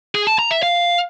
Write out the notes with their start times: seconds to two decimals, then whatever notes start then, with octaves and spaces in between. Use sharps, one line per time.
0.15 G#4
0.27 A5
0.39 A#5
0.51 E5
0.63 F5